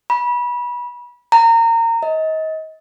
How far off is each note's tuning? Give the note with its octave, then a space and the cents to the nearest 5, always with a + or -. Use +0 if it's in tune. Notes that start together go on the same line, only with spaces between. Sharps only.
B5 -25
A#5 -25
D#5 +30